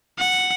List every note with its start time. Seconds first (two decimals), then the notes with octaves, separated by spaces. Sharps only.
0.19 F#5